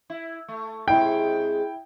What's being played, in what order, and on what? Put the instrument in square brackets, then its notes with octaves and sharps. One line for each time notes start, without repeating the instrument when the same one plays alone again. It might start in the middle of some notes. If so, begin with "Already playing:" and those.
[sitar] E4
A3
[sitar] C3 G#3 [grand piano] E4 G5